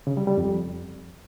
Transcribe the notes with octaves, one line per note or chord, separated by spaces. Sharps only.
C#3
G3
G3
F2